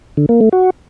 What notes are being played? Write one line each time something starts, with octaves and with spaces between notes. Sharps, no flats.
D3
A#3
A3
F#4